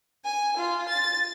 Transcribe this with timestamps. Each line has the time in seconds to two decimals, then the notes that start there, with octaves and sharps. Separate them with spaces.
0.24 G#5
0.57 F4
0.89 A6